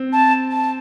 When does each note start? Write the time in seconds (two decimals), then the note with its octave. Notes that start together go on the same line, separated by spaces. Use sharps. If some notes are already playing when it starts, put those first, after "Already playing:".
Already playing: C4
0.13 A5
0.51 A5